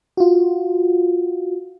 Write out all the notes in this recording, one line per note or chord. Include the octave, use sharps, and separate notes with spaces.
F4 F#4